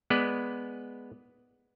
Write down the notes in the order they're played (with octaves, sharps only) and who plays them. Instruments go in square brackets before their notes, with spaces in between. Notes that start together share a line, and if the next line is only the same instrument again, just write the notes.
[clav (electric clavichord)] G#3 B3 B4 D5